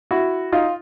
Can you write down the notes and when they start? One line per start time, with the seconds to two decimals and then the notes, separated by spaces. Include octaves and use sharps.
0.11 E4 F#4
0.52 D#4 F4